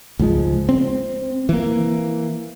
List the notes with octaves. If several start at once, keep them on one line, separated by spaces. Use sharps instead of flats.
C#2 G#2 F3 G#3
C4
E3 A#3